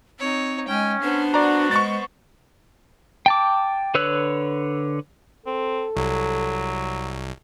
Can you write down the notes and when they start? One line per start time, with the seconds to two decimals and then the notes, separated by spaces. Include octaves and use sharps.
0.20 C4 D#4 C#5
0.68 G#3 C#4 G5 G#5
1.02 B3 D4 C5
1.34 F#4 D5 A#5
1.71 G#3 C#6 A6
3.26 G5 A5 D6
3.95 D3 B4 C#5 E6 F#6
5.46 C4 A4
5.97 C2 F#3